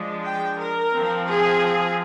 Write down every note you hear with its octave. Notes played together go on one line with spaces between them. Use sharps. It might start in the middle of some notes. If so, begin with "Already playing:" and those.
Already playing: F3 G#3 D4
G5
A#4
F3 C4
G#4